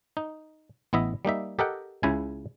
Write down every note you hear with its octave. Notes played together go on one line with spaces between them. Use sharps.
D#4
A1 B3 E4 D#5 E5
G3 A#3 D#4 E5
G4 A4 A#4 D#5 F#5 G5
C#2 C#3 E4 G#5